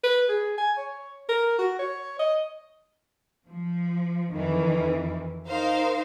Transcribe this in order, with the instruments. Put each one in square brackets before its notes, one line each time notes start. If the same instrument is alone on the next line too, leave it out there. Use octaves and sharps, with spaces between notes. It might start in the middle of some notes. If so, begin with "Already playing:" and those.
[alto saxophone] B4
G#4
G#5
C#5
A#4
F#4
C#5
D#5
[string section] F3
F2 D#3 E3
D#4 A#4 C5 F5